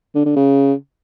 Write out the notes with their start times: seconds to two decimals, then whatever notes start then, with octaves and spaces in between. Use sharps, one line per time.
0.15 D3
0.26 D3
0.36 C#3